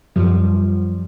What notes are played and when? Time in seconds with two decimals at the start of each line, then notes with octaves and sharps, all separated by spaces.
0.16 F#2 F3 G3